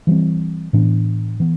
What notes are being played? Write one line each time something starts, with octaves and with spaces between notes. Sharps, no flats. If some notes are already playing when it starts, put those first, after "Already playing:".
E3 G3 C4
A2 E3 B3 D4
E3 B3